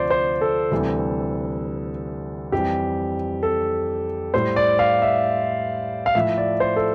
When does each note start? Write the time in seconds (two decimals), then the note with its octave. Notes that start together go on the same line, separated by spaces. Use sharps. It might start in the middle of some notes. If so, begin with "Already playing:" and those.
Already playing: D2 C3 F3 C5 D5
0.11 C5
0.41 A4
0.72 D2 C3 E3 G3
2.52 F2 E3 G3 G4
3.43 A4
4.34 A2 G3 C5
4.56 D5
4.79 F5
5.02 E5
6.06 F5
6.15 A2 F3 E5
6.38 D5
6.60 C5
6.76 A4